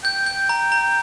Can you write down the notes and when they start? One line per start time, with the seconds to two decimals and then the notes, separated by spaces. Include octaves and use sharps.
0.04 G5 G6
0.26 G6
0.49 A#5
0.72 A#5